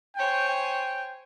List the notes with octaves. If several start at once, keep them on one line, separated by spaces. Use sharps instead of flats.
C5 C#5 G5 G#5
G5